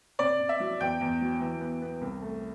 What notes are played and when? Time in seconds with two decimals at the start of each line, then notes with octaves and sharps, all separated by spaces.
0.19 C3 D5
0.39 C3
0.49 E5
0.60 F#3
0.80 E2 G5
1.01 E2
1.21 F#3
1.40 E3
1.61 B3
1.82 B3
2.01 C2
2.22 A3